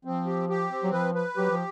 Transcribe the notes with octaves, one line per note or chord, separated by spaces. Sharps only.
F3 C4
G4
G4
C4
F#3
F3 B4
B4
F#3 G4
F3